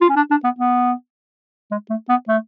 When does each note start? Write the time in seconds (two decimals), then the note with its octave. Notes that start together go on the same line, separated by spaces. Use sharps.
0.01 F4
0.09 C#4
0.16 D4
0.30 D4
0.44 B3
0.59 B3
1.71 G#3
1.90 A3
2.09 B3
2.28 A3